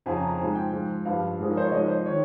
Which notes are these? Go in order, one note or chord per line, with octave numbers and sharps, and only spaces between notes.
F2 C#3 F3 G#5
A#5
A#5
G#2 F3 G#5
G5
G#2 F3
G2 F3 F5
G#2 F3 G#4
A#4
C5
C#5
G#2 F3 D#5
C5
D#3 C#5